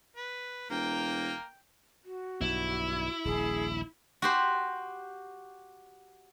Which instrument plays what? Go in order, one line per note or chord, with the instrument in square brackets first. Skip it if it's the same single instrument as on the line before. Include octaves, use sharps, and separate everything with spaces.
[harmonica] B4
[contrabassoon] E1 [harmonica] A#3 A#4 [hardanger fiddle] G5
[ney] F#4
[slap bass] B1 G2 [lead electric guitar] E4
[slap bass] D#1 A#1 [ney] G#4
[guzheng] F#4 G4 C5